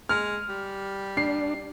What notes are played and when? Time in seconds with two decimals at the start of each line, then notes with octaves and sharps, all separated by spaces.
0.09 G#3 F6
0.49 G3
1.17 D4 C7